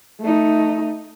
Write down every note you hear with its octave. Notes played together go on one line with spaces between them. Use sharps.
A3 D#4